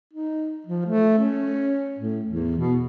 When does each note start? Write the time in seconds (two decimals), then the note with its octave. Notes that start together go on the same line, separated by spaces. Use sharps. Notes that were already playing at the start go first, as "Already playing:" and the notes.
0.13 D#4
0.67 F3
0.86 A3
1.18 C#4
1.99 A2
2.26 E2
2.58 B2